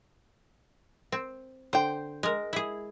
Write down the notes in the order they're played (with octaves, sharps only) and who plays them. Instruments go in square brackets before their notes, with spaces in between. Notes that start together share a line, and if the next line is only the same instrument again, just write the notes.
[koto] C4
[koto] D3 [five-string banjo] C5 G5
[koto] G#3 A#4
E4 G#4